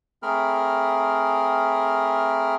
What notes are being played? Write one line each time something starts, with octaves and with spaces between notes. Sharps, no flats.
A3 C4 G#4 A#4 B5 F6